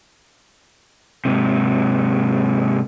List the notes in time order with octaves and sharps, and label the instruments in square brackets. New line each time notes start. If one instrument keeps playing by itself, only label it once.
[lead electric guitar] G#2 C3